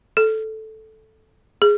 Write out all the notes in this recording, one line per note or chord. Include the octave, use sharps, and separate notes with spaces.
A4
G#4